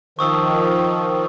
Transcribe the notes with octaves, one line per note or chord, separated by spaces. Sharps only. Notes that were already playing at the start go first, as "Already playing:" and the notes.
D#3 F3 C#6 D#6 E6